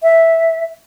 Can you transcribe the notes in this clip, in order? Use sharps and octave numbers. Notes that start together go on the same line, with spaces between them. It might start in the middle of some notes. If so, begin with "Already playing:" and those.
E5